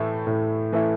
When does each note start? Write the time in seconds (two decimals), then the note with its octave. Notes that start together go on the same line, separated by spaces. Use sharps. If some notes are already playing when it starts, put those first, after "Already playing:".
Already playing: A2 E3 A3 E4
0.27 A2
0.73 E3 A3 E4